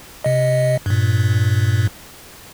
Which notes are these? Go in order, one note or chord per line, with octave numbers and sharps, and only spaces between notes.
C3 D#5
G2 A#2